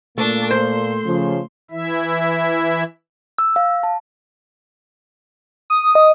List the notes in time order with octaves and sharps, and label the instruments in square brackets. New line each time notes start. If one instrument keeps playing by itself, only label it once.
[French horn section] A#2 A#3 [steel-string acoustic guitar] A3 [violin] D4 A6
[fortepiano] C5 [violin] C6
[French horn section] C#3 F3
[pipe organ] E3 E4 E5
[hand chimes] E6
F5
A5
[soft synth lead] D#6
[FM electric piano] D#5